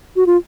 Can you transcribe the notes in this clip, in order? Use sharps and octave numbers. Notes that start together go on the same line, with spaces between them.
F#4
F4